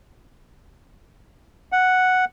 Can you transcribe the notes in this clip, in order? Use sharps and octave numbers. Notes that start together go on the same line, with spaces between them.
F#5